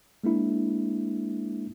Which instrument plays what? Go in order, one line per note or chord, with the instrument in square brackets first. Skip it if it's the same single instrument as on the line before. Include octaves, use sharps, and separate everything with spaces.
[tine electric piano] G#3 A#3 D4 E4